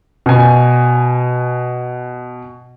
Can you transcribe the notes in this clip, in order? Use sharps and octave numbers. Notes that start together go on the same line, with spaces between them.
B2 G#5